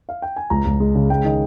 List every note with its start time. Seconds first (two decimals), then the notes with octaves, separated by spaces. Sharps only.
0.09 F5
0.22 G5
0.36 G#5
0.50 C#2 A#5
0.65 C#2
0.80 G#3
0.95 C#3
1.10 G#3 G5
1.24 D#3 D#5